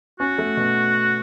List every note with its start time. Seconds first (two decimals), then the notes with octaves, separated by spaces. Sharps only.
0.19 C#4 F#4
0.38 A3
0.57 B2